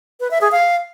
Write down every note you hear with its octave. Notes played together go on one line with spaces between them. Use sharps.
B4
E5
G#4
F5